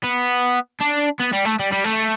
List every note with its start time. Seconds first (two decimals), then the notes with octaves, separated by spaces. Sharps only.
0.04 B3
0.81 D4
1.20 B3
1.33 G3
1.45 A3
1.60 G3
1.72 G3
1.84 A3